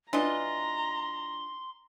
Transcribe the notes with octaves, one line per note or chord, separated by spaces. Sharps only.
E3 B3 D4 F4 D#5 A#5 C6